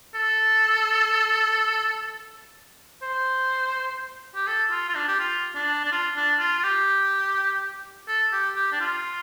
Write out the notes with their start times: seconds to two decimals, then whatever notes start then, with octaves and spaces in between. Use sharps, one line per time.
0.14 A4
3.02 C5
4.35 G4
4.47 A4
4.71 F4
4.89 F4
4.95 D4
5.08 G4
5.20 F4
5.55 D4
5.84 D4
5.92 F4
6.16 D4
6.39 F4
6.59 F4
6.64 G4
8.08 A4
8.32 G4
8.56 G4
8.72 D4
8.81 F4